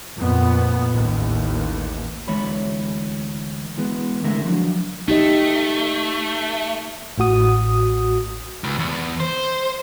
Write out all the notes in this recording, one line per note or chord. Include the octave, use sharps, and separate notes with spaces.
F2 A#2 B3
A1 D#2
D2 E3 G#3 C#5 B5
E3 G#3 B3
D3 G#3 A3 E4 A#4
F3 F#3 D4
A3 D#4 G4 D#5
A1 A2 F#4 D#6
C#2
E2
C5